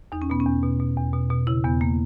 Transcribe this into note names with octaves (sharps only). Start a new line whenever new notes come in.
E2 D#4
C#4
B2 B3
C#4
E2
B2
B2
E2
B2
B2
C#3 E4
E2 B3
A#3